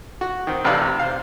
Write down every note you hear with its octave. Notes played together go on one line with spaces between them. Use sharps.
F#4
D#3 C4
A1 C3 D#4 B4 D5 F5
C3
C5 F5